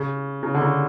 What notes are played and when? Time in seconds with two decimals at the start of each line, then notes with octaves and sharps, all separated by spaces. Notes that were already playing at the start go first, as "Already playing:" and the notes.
Already playing: C#3
0.43 C#3
0.54 D3
0.62 C#3